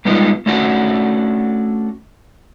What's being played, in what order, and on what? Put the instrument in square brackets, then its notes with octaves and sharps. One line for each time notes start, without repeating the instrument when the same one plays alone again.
[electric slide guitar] G3 G#3 B3 D4 D#4 F4
A3 C#4 D4 F#4 F#5